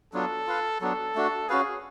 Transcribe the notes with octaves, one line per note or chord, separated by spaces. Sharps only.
F#3 B3 D4 F4 A4
F4 B4 F5
F#3 B3 D4 A4
A3 D4 F#4
C#4 F#4 G#4 B4 F5